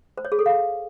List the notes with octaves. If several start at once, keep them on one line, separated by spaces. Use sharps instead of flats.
C5
C#5
G#4
A4
F5